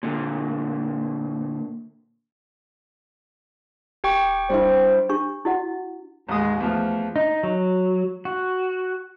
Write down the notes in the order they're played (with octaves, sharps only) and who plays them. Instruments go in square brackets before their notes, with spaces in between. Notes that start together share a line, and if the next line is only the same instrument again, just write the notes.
[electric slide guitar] A#2 D3
[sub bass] D#1 [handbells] G4 G5 C#6
[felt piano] G3 D4 E4 [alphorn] C5
[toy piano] D4 G4 C#6
E4 F#4 D#5 F#5
[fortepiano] A1 D#6 [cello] D#2 G#3
[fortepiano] E2 F3 [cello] A3
[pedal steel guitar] D#4
F#3
F#4